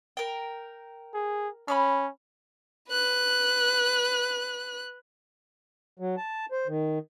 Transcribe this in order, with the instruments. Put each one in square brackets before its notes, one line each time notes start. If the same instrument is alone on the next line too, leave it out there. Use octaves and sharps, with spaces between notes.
[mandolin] A#4 G5
[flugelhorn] G#4
[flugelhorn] C#4 [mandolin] B5 D6 F6
[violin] B4 F#6
[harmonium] F#3
A5
C5
D#3